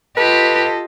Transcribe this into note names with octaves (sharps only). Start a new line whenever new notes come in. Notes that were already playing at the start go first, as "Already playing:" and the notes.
F4 G4 A4 B4 D#5